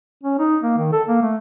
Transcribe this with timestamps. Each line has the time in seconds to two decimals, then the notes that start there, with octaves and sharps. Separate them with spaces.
0.24 C#4
0.39 D#4
0.62 A#3
0.78 D#3
0.93 A4
1.08 A#3
1.22 A3